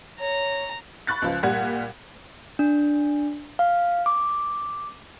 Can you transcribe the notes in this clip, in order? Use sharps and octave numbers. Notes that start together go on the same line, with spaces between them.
C#5 A#5
B5 C#6 F#6 A6
C#2 F3
A#2 G3 F#5 G#6
D4
F5
D6